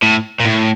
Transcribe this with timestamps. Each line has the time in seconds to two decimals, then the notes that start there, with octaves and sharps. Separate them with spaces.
0.03 A2
0.40 A#2
0.45 A2